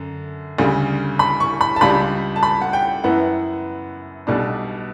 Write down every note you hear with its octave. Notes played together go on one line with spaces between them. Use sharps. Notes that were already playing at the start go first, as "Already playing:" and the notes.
Already playing: F#2 D3
D2 C#3 G3
B5
C#6
B5
A5
C#2 C#3 G3 D4 B5
A5
B5
F#5
G5
F#2 E3 B3 E4 F#5
B1 B2 G3 D4